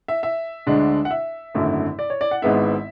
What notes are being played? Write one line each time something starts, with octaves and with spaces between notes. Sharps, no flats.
E5
E5
D2 D3 G#3 D4
F#5
E5
G#1 F#2 D3 A3 E4
D5
C#5
D5
F#5
G#1 G#2 G#3 B3 E4 E5